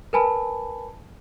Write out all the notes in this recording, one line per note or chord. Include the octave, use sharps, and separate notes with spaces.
A#4 B4 G#5 A5 B5